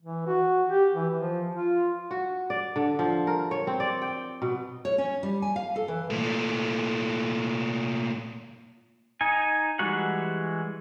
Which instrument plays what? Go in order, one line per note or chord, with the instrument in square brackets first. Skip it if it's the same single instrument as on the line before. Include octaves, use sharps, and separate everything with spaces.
[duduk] E3
F#4
G4
E3
F3
F4
[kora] F#4
D5
D3
F3
A#4
C#5
C4
D5
G5
B2
[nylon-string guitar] C#5
C#4
G3
G#5
F5
A4
E3
[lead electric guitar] A#2 A3
[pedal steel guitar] D#4 G#5
E3 G3 G#3 F#4 F#5